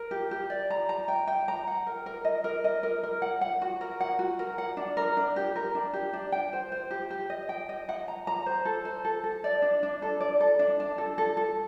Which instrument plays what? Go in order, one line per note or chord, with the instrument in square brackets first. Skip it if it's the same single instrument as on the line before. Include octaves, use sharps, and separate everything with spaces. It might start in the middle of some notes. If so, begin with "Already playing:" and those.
Already playing: [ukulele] A#4
G4
G4
D5
A#5
A#5
G5
G5
A#5
F#5
A#4
A#4
D#5
A#4
D#5
A#4
A#4
F#5
F#5
F#4
A#4
F#5
F#4
A#4
F#5
D4
A#4
D4
G4
A#4
D4
G4
D4
G5
C5
C5
G4
G4
D#5
G5
D#5
F#5
A#5
A#5
C5
A4
C5
A4
A4
D5
D4
D4
A4
D5
A4
D4
D4
A4
A4
A4